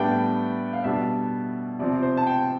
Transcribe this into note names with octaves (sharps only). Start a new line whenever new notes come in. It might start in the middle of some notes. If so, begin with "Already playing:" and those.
Already playing: A2 G3 B3 D4 G5
F5
B2 G3 D4 E5
C3 F3 C4 D5
C5
A5
G5